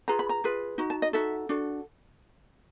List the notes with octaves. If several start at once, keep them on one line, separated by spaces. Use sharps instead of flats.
F4 G#4 B4 A#5
B5
A#5
F4 G#4 B4
D#4 F#4
A5
D#5
D#4 F#4 A4 E5
D4 F#4 A4